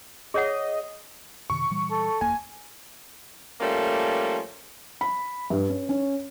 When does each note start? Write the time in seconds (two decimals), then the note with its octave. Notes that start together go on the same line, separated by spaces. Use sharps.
0.34 G#4 C#5 D#5 F#5
1.50 F#2 C3 D#3 C#6
1.71 A#2 E3 G3
1.91 A4
2.21 F#1 E2 A#3 G#5
3.61 F3 G3 A3 A#3 C#4
5.01 B5
5.50 G2
5.69 C#4
5.89 C#4